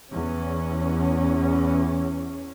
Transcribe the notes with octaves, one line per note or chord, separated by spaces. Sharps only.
E2 C#4